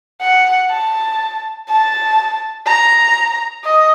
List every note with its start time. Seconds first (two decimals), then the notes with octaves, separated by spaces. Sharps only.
0.22 F#5
0.71 A5
1.69 A5
2.67 A#5
3.65 D#5